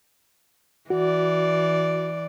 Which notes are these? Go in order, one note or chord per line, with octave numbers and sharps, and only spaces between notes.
E3 F#4 D5